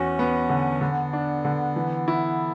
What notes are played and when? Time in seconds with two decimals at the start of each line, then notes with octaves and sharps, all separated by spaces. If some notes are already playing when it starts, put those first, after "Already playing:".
Already playing: E2 C#4 F#4
0.19 B3
0.50 D3
0.81 D3 B3
1.13 D4
1.45 D3
1.76 E3
2.08 E4